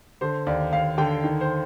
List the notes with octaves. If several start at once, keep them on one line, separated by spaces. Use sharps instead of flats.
D3 C5
D#2 D5
D#2 F5
D3 G5
D#3
C5